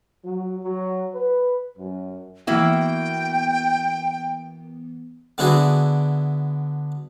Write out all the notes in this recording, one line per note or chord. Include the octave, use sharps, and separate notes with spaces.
F#3
F#3
B4
F#2
E3 A#3 B3 E4 F#4 G5
D3 B3 D4 E4 F#4 G#4